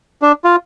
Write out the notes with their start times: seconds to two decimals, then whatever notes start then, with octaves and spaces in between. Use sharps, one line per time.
0.22 D4
0.44 F4